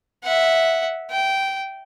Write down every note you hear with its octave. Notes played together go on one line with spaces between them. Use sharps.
E5 F#5
G5